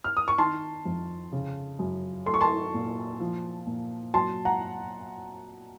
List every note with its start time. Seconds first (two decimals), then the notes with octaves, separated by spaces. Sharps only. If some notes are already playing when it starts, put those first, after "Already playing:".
0.04 F6
0.17 D#6
0.28 C#6
0.38 D#3 A5 C6
0.85 F2
1.32 C#3
1.79 F#2
2.26 A3 C6
2.34 C#6
2.41 A5 C6
2.74 A#2
3.20 F3
3.67 A#2
4.14 F#3 A5 C6
4.45 F#5 A#5